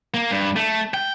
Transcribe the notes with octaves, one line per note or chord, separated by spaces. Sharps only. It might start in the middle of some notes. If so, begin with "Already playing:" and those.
A#3
G2
A3
G5